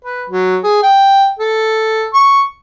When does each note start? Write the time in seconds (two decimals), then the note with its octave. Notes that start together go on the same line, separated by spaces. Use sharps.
0.04 B4
0.30 F#3
0.64 G#4
0.83 G5
1.39 A4
2.14 C#6